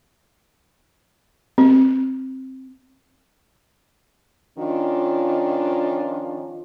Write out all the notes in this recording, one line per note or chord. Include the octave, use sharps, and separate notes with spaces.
C4
D#3 F3 C#4 D4 F4